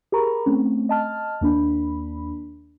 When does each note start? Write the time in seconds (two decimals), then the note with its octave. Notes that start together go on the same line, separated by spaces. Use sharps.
0.12 G4 G#4 A#4 A#5 B5 C#6
0.46 A3 C4 C#4
0.89 D#5 A5 F6
1.41 D#2 A#3 D4 B5